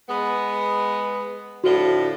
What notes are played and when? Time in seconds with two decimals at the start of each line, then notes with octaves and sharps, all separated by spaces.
0.08 G#3 B3
1.64 A2 D3 F3 F#4 F5 G7